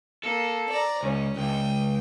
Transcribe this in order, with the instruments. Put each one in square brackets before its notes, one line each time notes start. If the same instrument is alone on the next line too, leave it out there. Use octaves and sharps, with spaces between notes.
[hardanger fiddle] A#3 [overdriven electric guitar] A4
[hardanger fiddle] D5 A#5
[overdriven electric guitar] C#2 [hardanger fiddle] C#4
[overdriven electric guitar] C#2 [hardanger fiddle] G5